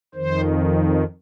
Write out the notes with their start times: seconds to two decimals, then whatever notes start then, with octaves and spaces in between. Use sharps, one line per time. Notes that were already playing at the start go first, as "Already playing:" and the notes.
0.15 F2 D#3 C5